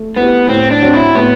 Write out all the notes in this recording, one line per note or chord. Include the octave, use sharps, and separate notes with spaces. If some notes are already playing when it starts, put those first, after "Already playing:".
Already playing: A3
B3 E4 G4 B4
A2 C4
D4
F#3 C4
E4
A2 B3